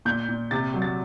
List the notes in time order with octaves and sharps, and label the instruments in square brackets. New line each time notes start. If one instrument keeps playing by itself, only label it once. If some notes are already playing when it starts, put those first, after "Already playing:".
[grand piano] A#2 G6
A#2
C3 A6
F#3
A6